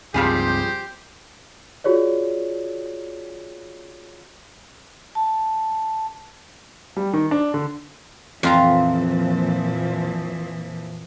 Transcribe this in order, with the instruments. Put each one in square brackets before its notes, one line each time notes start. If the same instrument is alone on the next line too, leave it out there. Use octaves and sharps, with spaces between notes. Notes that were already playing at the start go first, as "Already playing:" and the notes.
[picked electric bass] C#2 G2 C4 [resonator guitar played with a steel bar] F3 G3 G#4 [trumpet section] G4 C5
[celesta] F4 F#4 G#4 C#5 D5
[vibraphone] A5
[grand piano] G3
D#3
D4
D3
[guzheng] F2 F4 A#5 [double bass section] A#2 F3 [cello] E3